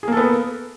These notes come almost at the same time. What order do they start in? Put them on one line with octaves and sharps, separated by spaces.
G#4 A#3 A4 B3